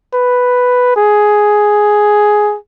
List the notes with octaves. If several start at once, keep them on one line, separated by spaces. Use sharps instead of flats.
B4
G#4